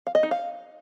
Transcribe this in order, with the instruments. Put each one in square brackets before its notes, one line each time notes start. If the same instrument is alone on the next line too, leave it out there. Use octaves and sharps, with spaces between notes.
[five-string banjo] F5
D#5
D#4
F5